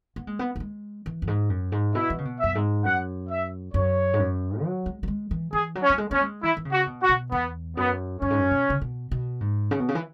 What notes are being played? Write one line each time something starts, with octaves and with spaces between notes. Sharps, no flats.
B3
G#3
B3
B3
G#3
E3
F#2
G#2
F#2
G#2
B2 E4
E3
C#3
B2
F#2 E5
G#2
F#2 F#5
E5
F#2 C#5
G#2
F#2
F#3
G#3
F#3
G#3
E3
E3 G#4
F#3
C#4
F#3
G#3
B3 C#4
G#3
E3 E4
E3
C#3
F#4
B2
F#4
B2
E2 B3
F#2 B3
F#2 C#4
G#2
F#2
B2
C#3
B2
B2
G#2
C#3
B2
C#3
E3